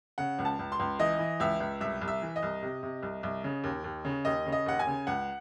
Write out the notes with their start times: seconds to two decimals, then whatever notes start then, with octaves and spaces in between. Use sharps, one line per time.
0.18 C#3 F#5
0.39 C#2
0.45 A5
0.59 C#2
0.72 C6
0.79 C#2
0.99 E3 D#5
1.19 E3
1.40 C#2 E5
1.60 C#2
1.81 C2 E5
2.01 C2
2.08 E5
2.22 E3
2.36 D#5
2.43 C2
2.62 C3
2.83 C3
3.03 C2
3.23 C2
3.44 C#3
3.64 D#2
3.84 D#2
4.05 C#3
4.25 D#2 D#5
4.46 C#3
4.52 D#5
4.66 D#2 F#5
4.79 G#5
4.87 C#3
5.07 C#2 F#5